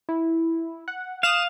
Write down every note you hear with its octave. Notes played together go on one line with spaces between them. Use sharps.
E4
F#5
F5 D#6 F#6 E7